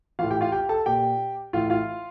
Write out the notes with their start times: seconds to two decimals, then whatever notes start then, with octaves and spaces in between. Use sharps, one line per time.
0.19 E3 F4 F5
0.23 A2
0.31 G4 G5
0.41 F4 F5
0.52 G4 G5
0.69 A4 A5
0.86 A#2 G4 G5
1.53 A2 E3 F4 F5
1.70 F4 F5